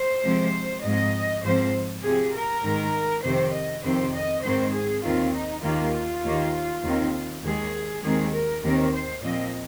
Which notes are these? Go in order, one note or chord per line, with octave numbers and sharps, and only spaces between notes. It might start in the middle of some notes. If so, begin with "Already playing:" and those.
Already playing: C5
C3 F3 G#3 C4
G#2 F3 G#3 C4 D#5
G#2 F3 C4 C5
C3 F3 C4 G#4
A#4
G#2 D#3 G#3
F2 C3 D#3 C4 C5
D#5
F2 C3 D#3 C4 C5
D#5
G#2 D#3 G#3 C4 C5
G#4
D#2 D#3 C4 F4
D#4
D#2 D#3 A#3 F4
D#2 D#3 A#3
D#2 D#3 C4
D#2 D#3 G#3 G#4
D#2 D#3 G#3 C4 G#4
A#4
D#2 D#3 C4 A#4
C5
A#2 F3 C4 D#5